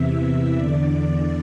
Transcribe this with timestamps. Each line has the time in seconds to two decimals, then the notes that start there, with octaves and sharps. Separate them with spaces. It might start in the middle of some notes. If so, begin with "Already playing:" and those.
Already playing: E2 C3 E3 E5
0.55 E2 D3 D5